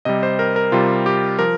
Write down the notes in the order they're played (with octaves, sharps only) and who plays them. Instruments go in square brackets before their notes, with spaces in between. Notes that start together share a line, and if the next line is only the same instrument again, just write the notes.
[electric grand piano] C3 G3 D#5
C5
A#4
A#4
C3 G3 F4
G4
F3 A#4